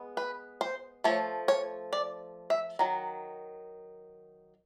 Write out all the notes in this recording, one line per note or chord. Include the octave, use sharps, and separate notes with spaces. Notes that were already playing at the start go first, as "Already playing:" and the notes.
Already playing: G#3 B3
B4
C5
F3 A3 C#5
C#5
D5
E5
D#3 F#3